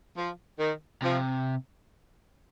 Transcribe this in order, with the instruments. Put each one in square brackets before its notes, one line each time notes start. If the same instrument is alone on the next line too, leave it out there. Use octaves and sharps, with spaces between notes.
[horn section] F3
D#3
[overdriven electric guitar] C3 [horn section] F3